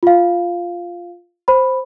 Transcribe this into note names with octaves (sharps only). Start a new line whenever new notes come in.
F4 F5
C5 B5